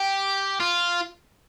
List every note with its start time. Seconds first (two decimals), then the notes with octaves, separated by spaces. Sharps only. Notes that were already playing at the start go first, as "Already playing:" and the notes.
Already playing: G4
0.60 F4